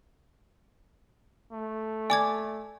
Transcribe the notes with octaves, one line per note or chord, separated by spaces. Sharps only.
A3
D5 G#5 D6 G#6